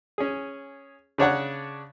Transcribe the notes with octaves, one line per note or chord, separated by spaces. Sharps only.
C#4 G#4
C#3 D4 C#5 F#5